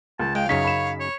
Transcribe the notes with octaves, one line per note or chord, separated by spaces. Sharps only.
C#2 A5
G#3 F5 G5
F#2 C#3 D#4 C#5 B6
B5 E7
C#5